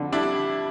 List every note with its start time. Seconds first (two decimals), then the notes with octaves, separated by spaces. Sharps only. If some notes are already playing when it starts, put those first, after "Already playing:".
Already playing: F2 D3
0.12 G3 D4 E4